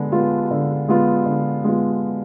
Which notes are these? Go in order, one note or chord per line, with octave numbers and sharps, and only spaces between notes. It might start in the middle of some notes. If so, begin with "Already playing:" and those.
Already playing: D3 G#3 B3
G#3 B3 F4
D3
G#3 B3 F4
D3
G#3 B3 F4